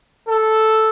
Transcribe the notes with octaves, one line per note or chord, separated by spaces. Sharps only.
A4